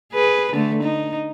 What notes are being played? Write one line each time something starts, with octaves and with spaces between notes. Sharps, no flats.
G#4 B4
D3 A3
D#4